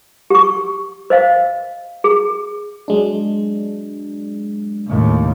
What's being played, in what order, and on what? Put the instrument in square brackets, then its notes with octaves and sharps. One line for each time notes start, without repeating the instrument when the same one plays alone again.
[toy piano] G4 C#6
C5 D#5 F5
G#4
[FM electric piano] F#3 G#3 D4
[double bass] D#2 A2